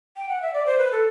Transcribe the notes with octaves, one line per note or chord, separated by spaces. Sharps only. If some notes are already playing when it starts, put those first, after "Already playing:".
G5
F#5
E5
D5
C5
B4
A4